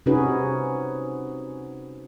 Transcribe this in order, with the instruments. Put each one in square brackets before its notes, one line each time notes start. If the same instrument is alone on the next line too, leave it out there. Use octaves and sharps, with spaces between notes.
[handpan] C3 C#4 D#4 F#4 G#4 B4